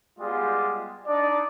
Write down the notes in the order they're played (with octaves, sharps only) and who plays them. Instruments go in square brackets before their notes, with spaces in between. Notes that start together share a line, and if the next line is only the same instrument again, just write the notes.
[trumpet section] G3 G#3 B3 F4 D5
D4 D#4 D5